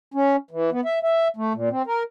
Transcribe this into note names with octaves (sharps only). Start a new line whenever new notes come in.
C#4
E3
B3
E5
E5
A3
A#2
C4
A#4